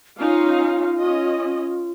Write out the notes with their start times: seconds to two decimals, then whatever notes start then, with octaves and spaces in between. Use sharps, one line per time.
0.19 C#4 D#4 F4 F5
1.00 C#4 D#5